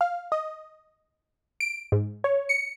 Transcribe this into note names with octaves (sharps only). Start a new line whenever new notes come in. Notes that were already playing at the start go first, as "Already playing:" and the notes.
F5
D#5
D7
G#2
C#5
C#7